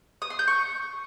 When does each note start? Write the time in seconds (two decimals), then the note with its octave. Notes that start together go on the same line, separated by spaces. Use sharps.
0.22 D#6
0.30 C6
0.39 G6
0.48 C#6